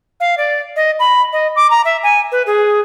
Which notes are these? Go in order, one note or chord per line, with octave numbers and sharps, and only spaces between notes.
F5
D5
D#5
B5
D#5
D6
A#5
E5
G#5
B4
G#4